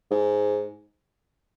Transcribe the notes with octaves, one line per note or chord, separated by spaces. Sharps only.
G#2